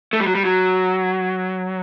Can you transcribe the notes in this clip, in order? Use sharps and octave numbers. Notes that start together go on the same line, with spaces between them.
A3
G3
F#3
G3
F#3